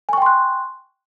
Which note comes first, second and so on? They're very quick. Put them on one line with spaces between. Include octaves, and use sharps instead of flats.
G#5 C#6 G5 C6 F#6